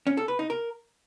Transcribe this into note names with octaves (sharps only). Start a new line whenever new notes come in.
C#4
A4
B4
D#4
A#4